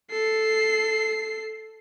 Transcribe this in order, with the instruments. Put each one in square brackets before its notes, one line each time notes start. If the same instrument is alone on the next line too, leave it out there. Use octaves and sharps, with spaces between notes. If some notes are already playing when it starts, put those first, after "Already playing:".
[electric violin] A4 C7